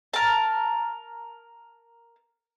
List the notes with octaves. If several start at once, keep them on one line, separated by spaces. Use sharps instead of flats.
A#4 A5